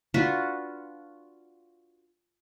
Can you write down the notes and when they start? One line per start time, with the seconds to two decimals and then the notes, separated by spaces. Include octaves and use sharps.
0.14 D4 F4 F#4 B4